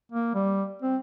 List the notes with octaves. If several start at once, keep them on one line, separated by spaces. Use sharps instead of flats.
A#3
G3
C4